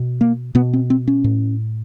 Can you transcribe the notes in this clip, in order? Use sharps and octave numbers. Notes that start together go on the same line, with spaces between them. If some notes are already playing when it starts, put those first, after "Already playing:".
Already playing: B2
A#3
B2 B3
C4
C4
C#4
A2